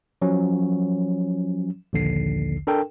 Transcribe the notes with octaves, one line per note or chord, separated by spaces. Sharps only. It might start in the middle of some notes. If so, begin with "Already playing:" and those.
F3 F#3 C#4
A#1 D#2 D3 C7
D4 A4 A#4 G5